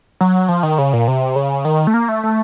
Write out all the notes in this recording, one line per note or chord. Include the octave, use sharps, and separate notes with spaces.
F#3
F3
D#3
C#3
A#2
C3
C#3
D#3
A3
A#3
A3
A3